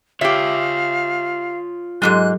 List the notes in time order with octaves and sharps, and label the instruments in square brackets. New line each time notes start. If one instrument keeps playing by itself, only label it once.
[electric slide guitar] F4 C#5 [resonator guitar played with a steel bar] G4 E5 [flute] F5
[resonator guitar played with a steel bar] G#2 C#3 G#3 [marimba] F#3 G4 A4 [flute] F#6